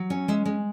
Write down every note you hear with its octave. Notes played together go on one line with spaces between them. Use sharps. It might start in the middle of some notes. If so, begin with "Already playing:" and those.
Already playing: F#3
C#4
G#3 E5
G#3